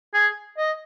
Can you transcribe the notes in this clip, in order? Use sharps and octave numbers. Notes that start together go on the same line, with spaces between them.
G#4
D#5